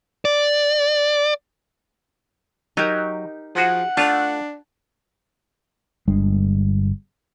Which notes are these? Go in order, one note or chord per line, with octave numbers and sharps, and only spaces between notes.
D5
F#3 D#4 G4 A#4
F3 F#4 G#4 F#5
A3 D4 F4 F5 A5
G1 G3 G#3 D4